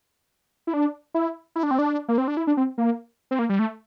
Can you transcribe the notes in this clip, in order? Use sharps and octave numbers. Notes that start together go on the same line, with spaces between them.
E4
D4
E4
E4
D4
C4
D4
A#3
C4
D4
E4
D4
C4
A#3
C4
A#3
G3
A3